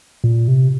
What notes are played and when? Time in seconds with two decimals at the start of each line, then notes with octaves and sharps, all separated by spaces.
0.24 A#2
0.48 C3